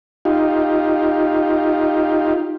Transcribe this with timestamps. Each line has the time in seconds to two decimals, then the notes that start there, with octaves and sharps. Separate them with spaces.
0.25 D#4 F4 G4